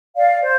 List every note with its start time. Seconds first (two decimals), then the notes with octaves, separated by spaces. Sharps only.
0.17 D5 F5
0.43 C5